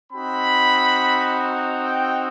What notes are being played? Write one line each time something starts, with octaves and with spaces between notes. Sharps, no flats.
C4 D#4 F#4 B5
A#5
G5